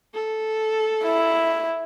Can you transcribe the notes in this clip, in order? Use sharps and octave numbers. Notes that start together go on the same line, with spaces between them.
A4
E4